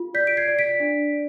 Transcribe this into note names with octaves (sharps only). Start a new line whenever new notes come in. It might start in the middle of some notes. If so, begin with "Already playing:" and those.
Already playing: F4
D5 G6 B6
D7
G#6 C7
D5
B6 D7
D4
D5